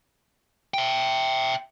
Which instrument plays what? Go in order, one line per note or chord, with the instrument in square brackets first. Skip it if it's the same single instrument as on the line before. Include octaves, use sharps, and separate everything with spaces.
[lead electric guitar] E5 G5